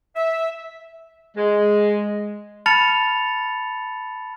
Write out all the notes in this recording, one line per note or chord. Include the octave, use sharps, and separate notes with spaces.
E5
G#3
A5 B5 F6 A6 C#7 F7